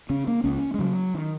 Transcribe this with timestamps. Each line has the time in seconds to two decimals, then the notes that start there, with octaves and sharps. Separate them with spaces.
0.10 C#3 C#4
0.27 A#3
0.44 C#2 C#4
0.74 G#3
0.79 C#3 F#3
1.14 D#3